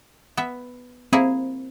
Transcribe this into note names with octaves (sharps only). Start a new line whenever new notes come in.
B3 E5
A#3 C4 E4 G#4